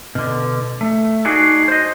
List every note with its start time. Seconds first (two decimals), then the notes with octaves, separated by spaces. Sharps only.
0.15 B2 D3
0.81 A3
1.25 D4 D#4 F#4 G#4
1.68 C5 D#5